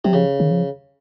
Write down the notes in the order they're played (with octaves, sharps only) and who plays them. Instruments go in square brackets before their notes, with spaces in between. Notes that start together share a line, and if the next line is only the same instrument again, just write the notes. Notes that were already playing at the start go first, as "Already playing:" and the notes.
[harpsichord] C3 [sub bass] F#3
[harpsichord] C#3 [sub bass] F3
[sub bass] D#3
F3